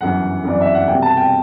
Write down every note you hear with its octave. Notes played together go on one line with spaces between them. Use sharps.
G1 F#2 E3 F#5
G1 F#2 E3 D5
E5
F#5
C2 B2 G5
A5
G5